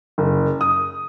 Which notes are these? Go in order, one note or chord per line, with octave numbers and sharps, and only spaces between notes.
F#1
D#6